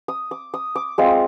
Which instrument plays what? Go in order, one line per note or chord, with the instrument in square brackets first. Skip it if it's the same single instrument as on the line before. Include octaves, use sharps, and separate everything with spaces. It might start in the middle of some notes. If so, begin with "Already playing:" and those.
[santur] D#6
D6
D#6
D6
G#3 C4 F4 D6